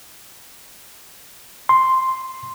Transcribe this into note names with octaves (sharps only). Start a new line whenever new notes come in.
C6